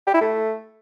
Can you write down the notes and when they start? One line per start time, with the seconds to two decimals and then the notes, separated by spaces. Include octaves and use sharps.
0.07 G4
0.14 E4
0.21 A3